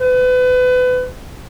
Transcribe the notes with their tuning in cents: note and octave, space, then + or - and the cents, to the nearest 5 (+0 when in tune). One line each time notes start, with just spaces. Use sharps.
B4 +30